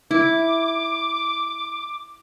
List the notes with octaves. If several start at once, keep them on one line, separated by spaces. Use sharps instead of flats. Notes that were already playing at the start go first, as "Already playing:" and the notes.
E4 D6